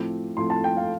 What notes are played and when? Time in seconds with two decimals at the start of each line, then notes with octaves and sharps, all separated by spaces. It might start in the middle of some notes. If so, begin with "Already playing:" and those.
Already playing: A2 F3 A3 C4 D6
0.37 A2 F3 A3 C4 C6
0.50 A5
0.64 G5
0.77 F5